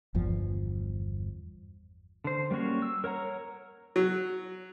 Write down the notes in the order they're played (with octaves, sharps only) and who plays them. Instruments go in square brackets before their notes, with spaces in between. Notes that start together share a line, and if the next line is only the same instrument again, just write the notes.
[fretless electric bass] G1 E2 G2 F3
[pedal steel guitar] D3 C5
G3 A#3 C#4 F#4 C#5
E6
A#4 C#5 F#5 A#5
[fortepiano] F#3